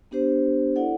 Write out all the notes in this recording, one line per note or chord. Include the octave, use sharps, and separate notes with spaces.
B3 D4 G4 C5
E4 A4 D5 F#5